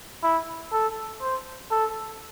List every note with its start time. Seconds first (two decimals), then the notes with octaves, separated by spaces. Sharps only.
0.23 E4
0.73 A4
1.22 C5
1.71 A4